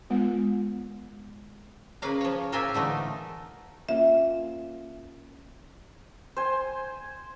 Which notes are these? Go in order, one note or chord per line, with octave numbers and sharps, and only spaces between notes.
G#3 B3 F4
C#3 A#3 B4 F5 G#5 A#5
F3 C#5
A2 A#3 F4 G4 E5 G#5
D3 E3 A3 D#4
A#3 C#4 F4 E5
C5 G#5